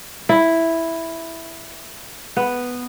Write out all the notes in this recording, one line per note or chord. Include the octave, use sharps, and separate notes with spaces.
E4
B3